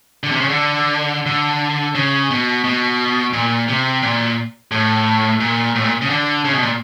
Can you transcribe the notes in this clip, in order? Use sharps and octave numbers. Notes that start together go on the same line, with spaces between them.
D3
C3
C#3
D3
D3
C#3
B2
B2
A#2
C3
A#2
A2
A#2
A2
A#2
C#3
D3
C#3
B2
A#2